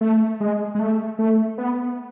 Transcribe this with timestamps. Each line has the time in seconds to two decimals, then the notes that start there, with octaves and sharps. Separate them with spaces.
0.01 A3
0.40 G#3
0.75 G#3
0.79 A3
1.19 A3
1.58 B3